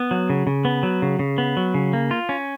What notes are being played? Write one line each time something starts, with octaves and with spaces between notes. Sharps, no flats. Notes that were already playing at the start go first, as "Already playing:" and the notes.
Already playing: B3
F#3
C#3
C#3
B3
F#3
C#3
C#3
B3
F#3
C#3
A#3
F4
C#4